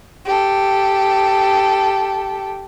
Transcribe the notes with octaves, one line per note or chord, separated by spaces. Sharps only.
G4 A4